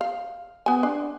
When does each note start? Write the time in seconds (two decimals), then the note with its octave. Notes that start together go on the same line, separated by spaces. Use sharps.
0.01 F5
0.66 B3 G#5
0.83 D4